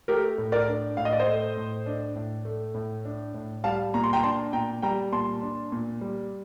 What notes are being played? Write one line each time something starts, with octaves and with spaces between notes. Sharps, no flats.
A3 G4 A#4
A2
A#4 D5
D4
A2 F5
D#5
D5
C5 D#5
A3
A2
D4
A2
A3
A2
D4
A2
G3 F5 A5
A#2 A#5
C6
G5 A#5
D4 A5 C6
A#2 G5 A#5
G3 G5 A#5
A#2 A5 C6
D4
A#2
G3